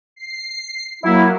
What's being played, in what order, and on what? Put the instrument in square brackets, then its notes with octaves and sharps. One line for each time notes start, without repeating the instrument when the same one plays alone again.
[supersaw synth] C7
[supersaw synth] F#3 A#3 [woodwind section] E4